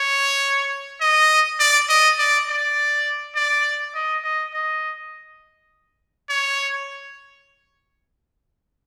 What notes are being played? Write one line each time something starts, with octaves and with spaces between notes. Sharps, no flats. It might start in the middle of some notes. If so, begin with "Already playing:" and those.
Already playing: C#5
D#5
D5
D#5
D5
D5
D5
D#5
D#5
D#5
C#5